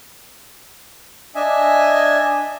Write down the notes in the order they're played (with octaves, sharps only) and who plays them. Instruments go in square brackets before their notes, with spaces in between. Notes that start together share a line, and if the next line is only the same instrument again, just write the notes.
[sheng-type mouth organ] D4 D#5 E5 G#5